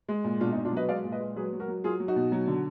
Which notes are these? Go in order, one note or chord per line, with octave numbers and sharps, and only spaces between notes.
G#3
A#2
B2 D4 F4
D#4
B2
D4 F4
F#3 B4 D#5
G#3 D5 F5
A#2
B4 D#5
G#3
F#3 G#4 B4
F#3
F#4 A#4
F#3
F#3 F4 G#4
F#3
D#4 F#4
B2
F#3
D3